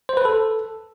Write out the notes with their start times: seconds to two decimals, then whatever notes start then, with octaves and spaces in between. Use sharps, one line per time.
0.09 C5
0.17 B4
0.25 A4